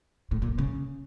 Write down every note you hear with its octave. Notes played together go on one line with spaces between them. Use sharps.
A2
A#2
C#3